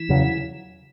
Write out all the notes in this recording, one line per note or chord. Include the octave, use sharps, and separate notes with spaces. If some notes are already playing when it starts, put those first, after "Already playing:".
Already playing: E3 E4
E2 C#3 F#3